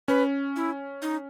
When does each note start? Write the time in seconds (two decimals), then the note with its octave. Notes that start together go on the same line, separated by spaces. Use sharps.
0.08 C#4 B4
0.56 E4
1.02 D#4